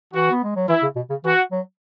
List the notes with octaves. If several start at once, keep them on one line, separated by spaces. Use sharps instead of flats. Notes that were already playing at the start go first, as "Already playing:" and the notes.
E3 F#4
B3
G#3
F#3
E3 E4
C#3
B2
C#3
E3 F#4
F#3